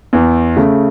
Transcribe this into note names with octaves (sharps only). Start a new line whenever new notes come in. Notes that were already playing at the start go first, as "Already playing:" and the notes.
E2
C#3 A3